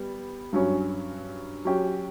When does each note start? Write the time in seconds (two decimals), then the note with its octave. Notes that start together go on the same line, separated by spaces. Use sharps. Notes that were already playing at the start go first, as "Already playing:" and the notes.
Already playing: G3 B3
0.53 G2 F#3 C#4
1.65 F#3 C#4 G4